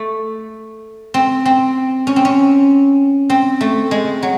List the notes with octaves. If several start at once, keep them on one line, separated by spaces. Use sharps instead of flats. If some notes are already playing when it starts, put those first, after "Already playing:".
Already playing: A3
C4
C4
C#4
C4
C#4
C4
A3
G#3
F#3